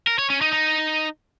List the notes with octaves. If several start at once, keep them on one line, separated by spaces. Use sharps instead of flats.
A#4
C#5
C#4
D#4
D#4